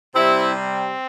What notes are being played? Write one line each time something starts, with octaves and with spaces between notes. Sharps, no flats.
C3 G3 C4 E4
C4